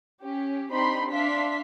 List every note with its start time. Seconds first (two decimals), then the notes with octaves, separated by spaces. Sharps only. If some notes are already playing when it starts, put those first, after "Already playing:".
0.23 C#4 G4
0.71 C4 D4 D#4 G4 B5 C6
1.11 D4 E5 F5 C6 B6